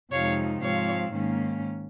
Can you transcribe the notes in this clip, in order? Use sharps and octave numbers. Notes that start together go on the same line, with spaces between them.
F2 C3 F3 G#3 D#4 C#5 F5
G#2 F3 G#3 C4 C#5 F5
G#2 D#3 A#3 C#4